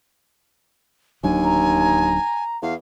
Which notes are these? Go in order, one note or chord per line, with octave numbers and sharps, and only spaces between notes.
D1 D#2 F#3 D4 G#5
A#5
E2 F5